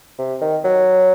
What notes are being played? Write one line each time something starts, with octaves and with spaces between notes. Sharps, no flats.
C3
D#3
F#3